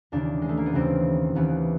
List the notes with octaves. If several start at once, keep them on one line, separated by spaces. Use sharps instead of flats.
D#2 C#3 E3 D4
G#3
A3
A#3
B3
D#2 C#3 E3 C4
D#2 C#3 E3 B3